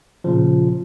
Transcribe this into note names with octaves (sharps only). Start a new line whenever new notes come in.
A#2 C#3 F3